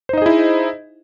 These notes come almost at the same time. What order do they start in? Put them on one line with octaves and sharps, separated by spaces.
C5 D#4 D#5 G#4 E4